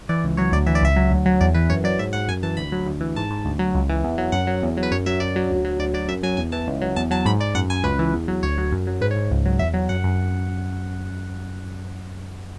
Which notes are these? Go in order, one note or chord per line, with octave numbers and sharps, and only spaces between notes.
E3 D5
C#2
F#3 C#5
D2 D5
E3 E5
D5
C#2 E5
F#3
D2
F#3
E2 D5
E3 B4
F#2 C#5
F#3 D5
G#2 E5
G#2 F#5
F#2 G#5
E3 A5
D2 B5
F#3
D2
E3
G#2 A5
G#2
D2
F#3
C#2
E3
E2
F#3
F#2 F#5
F#3
E2
F#3
B4
F#2 C#5
F#3 E5
F#2 D5
F#3
D2
F#3
D2 D5
F#3 D5
F#2 E5
F#3 G#5
E2 G#5
E3 A5
C#2
F#3
E2 A5
F#3 A5
G#2 B5
G#2 D5
F#2 F#5
F#2 G#5
C#2 B4
E3
E2
F#3
D2 C#5
F#3
F#2
F#3
G#2 B4
C#5
G#2
C#2
F#3
E2 E5
F#3
F#2 F#5
F#2